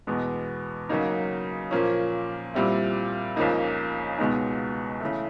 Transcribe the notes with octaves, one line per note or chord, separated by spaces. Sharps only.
E2 B2 G#3 B3
C#3 F#3 A#3 D#4
A#2 F3 A#3 C#4
A#2 G3 C4 E4
C#2 C#3 F3 A#3 D#4
C#2 B2 G#3 B3 D#4
C#3 E3 A3